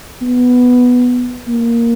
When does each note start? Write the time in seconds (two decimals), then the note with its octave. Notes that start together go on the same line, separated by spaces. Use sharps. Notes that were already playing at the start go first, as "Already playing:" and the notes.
0.22 B3
1.48 A#3